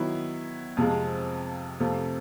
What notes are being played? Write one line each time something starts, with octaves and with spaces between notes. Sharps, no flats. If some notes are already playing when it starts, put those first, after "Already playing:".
Already playing: D#3 F#3 B3 E4
F2 C3 F3 G#3
F2 C3 F3 A3